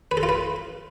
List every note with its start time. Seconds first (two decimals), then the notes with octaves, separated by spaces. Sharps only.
0.11 B4
0.17 A4
0.23 F4
0.29 B4